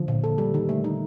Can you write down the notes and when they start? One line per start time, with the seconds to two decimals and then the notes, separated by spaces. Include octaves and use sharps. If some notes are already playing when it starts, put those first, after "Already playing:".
Already playing: D3 F3
0.08 A#2
0.24 A4
0.38 G3
0.54 D#3
0.69 A3
0.84 D#4